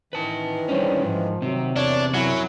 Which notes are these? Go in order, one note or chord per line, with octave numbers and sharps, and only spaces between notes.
D#3 E3 B4 A5
G3 G#3 C#4 D4 C5 C#5
G#2 F3
C3 D#3 F#3 C4
E2 D4 C#5
F#2 F#3 C#4 E4